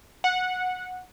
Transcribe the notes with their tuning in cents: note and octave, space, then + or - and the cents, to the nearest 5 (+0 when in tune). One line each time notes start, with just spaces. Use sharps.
F#5 -15